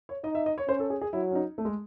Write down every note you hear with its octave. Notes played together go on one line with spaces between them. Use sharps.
C#5
D#4 D#5
E5
D#5
C#5
C#4 C5
A4
G#4
G#4
F#3 E4
C#4
D#4
A3
G#3